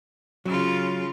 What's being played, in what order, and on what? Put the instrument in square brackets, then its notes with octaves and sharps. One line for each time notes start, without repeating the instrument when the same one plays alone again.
[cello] C#3 F4 [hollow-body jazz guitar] F#3